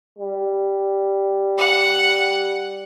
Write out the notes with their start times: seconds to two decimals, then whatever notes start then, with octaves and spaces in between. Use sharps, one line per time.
0.19 G3
1.58 F#5